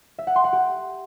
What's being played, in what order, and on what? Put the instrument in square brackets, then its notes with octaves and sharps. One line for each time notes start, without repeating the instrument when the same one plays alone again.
[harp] E5
F#5
C6
F#5
G4